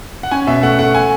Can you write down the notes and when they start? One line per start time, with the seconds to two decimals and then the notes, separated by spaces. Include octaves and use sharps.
0.23 F#5
0.31 C#4 G#5
0.47 B2 E5
0.63 A3 F#5
0.79 A3 F#5
0.95 G#5